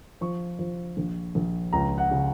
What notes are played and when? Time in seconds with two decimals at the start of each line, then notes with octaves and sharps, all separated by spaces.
0.21 F3 C#6
0.59 F3
0.97 A#1
1.35 A#1
1.73 C#2 A#5
1.98 F#5
2.11 C#3